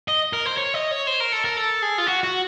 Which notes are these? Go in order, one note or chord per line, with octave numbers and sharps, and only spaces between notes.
D#5
A#4
C5
C#5
D#5
C#5
C5
A#4
A4
A#4
A4
G#4
F4
F#4
F#4